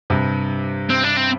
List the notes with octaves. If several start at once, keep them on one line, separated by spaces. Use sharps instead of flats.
G2 C3
C4
D4
C4